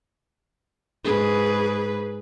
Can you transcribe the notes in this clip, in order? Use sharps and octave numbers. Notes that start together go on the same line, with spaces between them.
G#2 G#4 B4